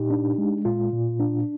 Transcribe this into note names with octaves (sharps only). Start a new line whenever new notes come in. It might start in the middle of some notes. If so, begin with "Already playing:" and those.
Already playing: A#2 D#4 G4
D4
G#3
A#2 F4
A#2
D4